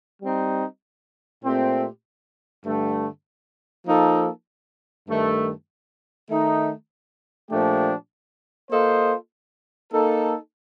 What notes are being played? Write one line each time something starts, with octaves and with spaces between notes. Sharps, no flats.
G3 C4 D#4
A#2 A3 C4 G4
G2 D3 A3
F3 A#3 D#4 A4
G2 D#3 A3
D#3 A3 D#4
A#2 F3 A3 D4 G4
A#3 F4 A4 C5 D#5
A#3 D#4 A4